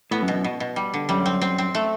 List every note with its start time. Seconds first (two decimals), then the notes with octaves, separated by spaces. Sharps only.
0.11 A2 B3
0.22 F#2
0.28 B2
0.34 F#2
0.44 B2
0.60 B2
0.76 G3
0.94 D3
1.09 F#2 G3
1.26 C4
1.42 C4
1.58 C4
1.75 A3